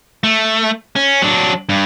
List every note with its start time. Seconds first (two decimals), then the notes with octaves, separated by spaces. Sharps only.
0.24 A3
0.96 C#4
1.22 F#3 D4
1.69 G2